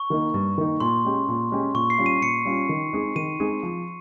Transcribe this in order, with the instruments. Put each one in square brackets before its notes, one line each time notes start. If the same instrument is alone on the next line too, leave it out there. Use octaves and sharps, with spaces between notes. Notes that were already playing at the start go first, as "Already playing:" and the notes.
Already playing: [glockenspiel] C#6
[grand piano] D#3 A#3 D#4
G2
D#3 A#3 D#4
[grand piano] A#2 [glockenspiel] C6
[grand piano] G#3 C#4 G4
A#2
G#3 C#4 G4
[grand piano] A#2 [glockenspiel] C#6
[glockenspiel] C7
[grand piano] G3 C#4 F4
[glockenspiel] D#7
[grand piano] A#2 [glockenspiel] C#7
[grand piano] G3 C#4 F4
D#3
G#3 C4 D#4 G#4
[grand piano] D#3 [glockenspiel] D#7
[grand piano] G#3 C4 D#4 G#4
F3